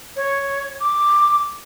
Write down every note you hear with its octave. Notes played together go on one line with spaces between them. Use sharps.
C#5
D6